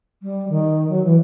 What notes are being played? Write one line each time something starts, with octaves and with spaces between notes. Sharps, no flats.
G3
D#3
F#3
E3